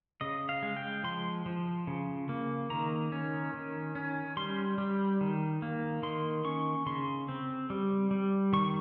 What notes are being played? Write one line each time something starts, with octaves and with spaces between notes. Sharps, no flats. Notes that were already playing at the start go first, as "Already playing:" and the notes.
C#3 D#5
F5
G#3
G5
F3 C6
F3
C#3
A#3
D#3 A#5
C#4
D#3
C#4
G3 C6
G3
D#3
A#3
D#3 C6
C#4 C#6
C#3 C6
C4
G3
G3
D#3 C#6